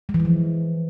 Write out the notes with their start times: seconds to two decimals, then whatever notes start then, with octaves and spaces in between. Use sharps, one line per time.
0.09 G#3
0.14 E3
0.20 G#3
0.25 F3